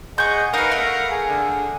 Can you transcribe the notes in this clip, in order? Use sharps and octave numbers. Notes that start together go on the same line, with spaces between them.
G#4 D#5 F#5 C#6 G6
D#4 A#4 B4 F5 F#5
A3
G#4
D3